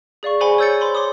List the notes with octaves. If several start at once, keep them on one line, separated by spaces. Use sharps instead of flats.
G#4 D5 F5 C#6
G#4 C5 F#5 G#5 B5 G7
C#5 E6 G6 A6 C#7
C5 B5 C6
C#5 C6 D6 D#6